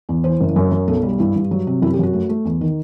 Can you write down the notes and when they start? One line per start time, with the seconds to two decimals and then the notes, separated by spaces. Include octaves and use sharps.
0.09 E2
0.24 E3 C5
0.40 F#1
0.56 F#2
0.72 F#3
0.88 B1 A4
1.03 G3
1.20 G2 E4
1.35 G2
1.51 F#3
1.67 C3
1.82 F#2 E4
1.93 G4
1.99 F#2 F#4
2.13 A3
2.29 A3
2.45 E2
2.61 D#3